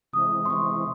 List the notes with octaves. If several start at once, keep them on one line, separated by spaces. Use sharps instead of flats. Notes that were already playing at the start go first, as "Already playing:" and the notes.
C3 E3 G#3 C4 E4 D#6
C6
C3 E3 G#3 C4 E4 C#6